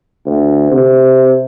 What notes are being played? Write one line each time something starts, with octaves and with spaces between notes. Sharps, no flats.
D2
C3